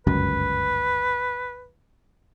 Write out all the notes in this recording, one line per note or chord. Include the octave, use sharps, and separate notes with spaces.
G1 C#2 F#2 B4